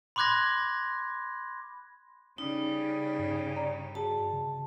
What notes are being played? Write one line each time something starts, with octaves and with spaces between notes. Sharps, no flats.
B5 C6 D6 F#6 G#6 A#6
C#3 G3 C#4 D#4
G2
D5 A#5
F#4 G#4 A5
C#3